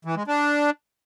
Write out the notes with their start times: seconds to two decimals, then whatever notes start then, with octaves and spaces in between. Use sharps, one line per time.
0.05 E3
0.16 G#3
0.27 D4